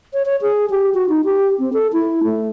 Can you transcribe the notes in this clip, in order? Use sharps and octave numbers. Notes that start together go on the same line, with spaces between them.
C#5
C#5
G#4
G4
F#4
D#4
G4
C4
A4
E4
A3